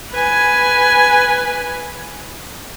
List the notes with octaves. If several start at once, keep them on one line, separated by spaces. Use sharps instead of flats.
B4 G#5